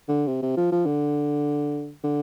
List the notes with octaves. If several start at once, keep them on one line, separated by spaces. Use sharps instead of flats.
D3
C3
C3
F3
F3
D3
D3